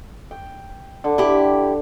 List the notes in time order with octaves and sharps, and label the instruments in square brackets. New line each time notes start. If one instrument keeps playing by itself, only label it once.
[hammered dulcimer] G5
D3
[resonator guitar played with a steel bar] E4 G4